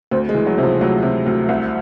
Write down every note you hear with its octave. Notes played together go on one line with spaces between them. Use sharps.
D2 C4
G#3
E3
F#3
C3 F3
D2 F#3
C3
D2
C2